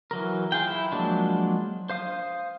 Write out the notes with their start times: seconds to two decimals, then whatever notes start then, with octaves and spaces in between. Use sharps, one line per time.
0.11 E3 F#3 A#4
0.52 F4 G#4 G5
0.68 E4
0.92 F3 F#3 G#3 A#3 D4
1.90 C5 F5 D#6